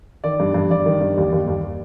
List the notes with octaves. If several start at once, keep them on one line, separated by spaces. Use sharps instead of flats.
D#3 D5
G2
G2
G2 D5
D#3
G2
D#2
D#2
D#2